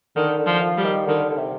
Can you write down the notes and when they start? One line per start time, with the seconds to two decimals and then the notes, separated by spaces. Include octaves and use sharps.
0.16 D3 D#3
0.39 D3
0.46 F3
0.62 F3
0.77 G3
0.84 D#3
1.07 D3 D#3
1.30 D3
1.38 C3